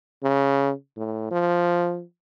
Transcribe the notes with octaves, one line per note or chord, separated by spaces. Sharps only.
C#3
A2
F3